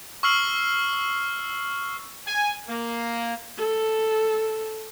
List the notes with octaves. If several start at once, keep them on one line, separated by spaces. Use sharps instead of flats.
C#6 E6 F6 C7 F#7
G#5
A#3
A4